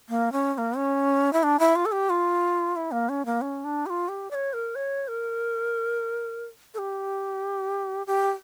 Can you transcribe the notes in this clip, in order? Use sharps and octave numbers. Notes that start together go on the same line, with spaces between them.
A#3
C#4
C#4
A#3
C#4
E4
D4
E4
F4
A4
G4
F4
E4
A#3
C#4
A#3
C#4
D4
G4
F4
G4
D5
C#5
A#4
C#5
A#4
A4
G4
G4